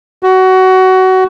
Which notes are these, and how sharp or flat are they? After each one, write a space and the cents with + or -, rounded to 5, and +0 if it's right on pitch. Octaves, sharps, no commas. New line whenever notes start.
F#4 +20